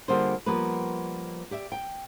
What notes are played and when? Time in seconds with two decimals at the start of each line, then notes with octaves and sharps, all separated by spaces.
0.08 D3 G3 A#3 F4 G#4 C5
0.46 F3 G3 A#3 B3 B4
1.51 G4 D5 E5
1.72 G5